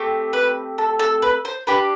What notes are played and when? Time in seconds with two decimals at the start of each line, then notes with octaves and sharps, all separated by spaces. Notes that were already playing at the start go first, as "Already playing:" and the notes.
Already playing: A3 C4 G4
0.33 B4
0.78 A4
0.99 A4
1.22 B4
1.45 C5
1.67 D4 G4 B4